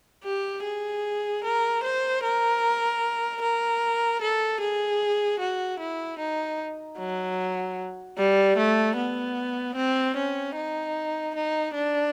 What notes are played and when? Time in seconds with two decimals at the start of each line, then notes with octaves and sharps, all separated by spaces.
0.24 G4
0.64 G#4
1.44 A#4
1.83 C5
2.23 A#4
3.41 A#4
4.22 A4
4.60 G#4
5.40 F#4
5.80 E4
6.19 D#4
6.98 F#3
8.18 G3
8.57 A3
8.97 B3
9.76 C4
10.16 C#4
10.56 D#4
11.35 D#4
11.74 D4